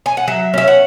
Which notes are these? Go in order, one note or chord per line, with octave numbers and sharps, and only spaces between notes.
G#5
F#5
F#3 E5
C#4 E5
F#5